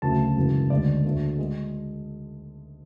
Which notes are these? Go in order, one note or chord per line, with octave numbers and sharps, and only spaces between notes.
D2 C#3 F#3 A3 A5
G#1 F#2 C#3 E3
D2 D3 G#3 D5
D2 D3 A3
G#3